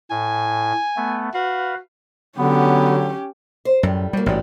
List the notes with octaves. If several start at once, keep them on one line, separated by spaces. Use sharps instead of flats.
A2 G#5
A3 B3
F#4 B4 F5
D3 F#3 B3 C#4 G4
C5
F#2 A2 G3
F#3 G3 A#3
A1 G#2 G3 F#4